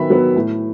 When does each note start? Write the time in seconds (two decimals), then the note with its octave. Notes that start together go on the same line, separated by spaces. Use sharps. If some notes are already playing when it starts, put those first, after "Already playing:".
Already playing: D#3 F#3 B3 E5 B5
0.10 F#3 B3
0.36 A2